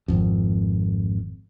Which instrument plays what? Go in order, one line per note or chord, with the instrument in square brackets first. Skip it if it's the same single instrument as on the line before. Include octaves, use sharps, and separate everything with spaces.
[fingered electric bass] G#1 F2